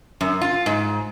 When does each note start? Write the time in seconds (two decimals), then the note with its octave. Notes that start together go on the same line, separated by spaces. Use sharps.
0.21 F#2
0.42 F4
0.66 G#2